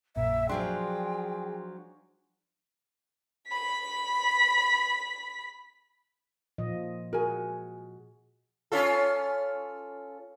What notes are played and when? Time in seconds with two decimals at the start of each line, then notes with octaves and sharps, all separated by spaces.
0.16 A#1 F#2 A#2 E5
0.49 F3 F#3 D4 G#4 G5 C6
3.49 B5 B6
6.58 A#2 F3 D#5
7.13 F#4 G#4 A#4 G#5
8.72 C#4 F4 A4